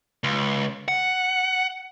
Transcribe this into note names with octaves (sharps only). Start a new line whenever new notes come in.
C#2
F#5